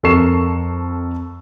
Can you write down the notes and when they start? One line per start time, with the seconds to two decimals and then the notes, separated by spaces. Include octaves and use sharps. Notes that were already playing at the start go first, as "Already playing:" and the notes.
0.03 F2 A4 A#4 C#6 C7 E7